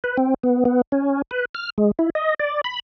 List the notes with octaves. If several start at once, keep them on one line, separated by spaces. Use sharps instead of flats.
B4
C4
B3
B3
C#4
B4
F6
G#3
E4
D#5
D5
B5